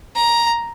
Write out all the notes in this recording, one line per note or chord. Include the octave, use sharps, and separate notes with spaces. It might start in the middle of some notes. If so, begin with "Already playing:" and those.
A#5